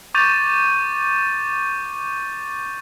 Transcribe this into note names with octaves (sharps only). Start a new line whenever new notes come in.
C#6 D6 G6 A6 D#7 F7